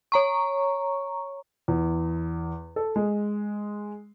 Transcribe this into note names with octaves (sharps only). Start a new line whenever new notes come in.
C#5 A#5 C#6
E2
A4
G#3